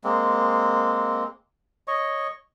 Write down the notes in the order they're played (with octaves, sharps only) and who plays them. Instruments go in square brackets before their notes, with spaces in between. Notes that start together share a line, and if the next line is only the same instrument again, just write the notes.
[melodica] G#3 A#3 C4
C#5 D#5 C#6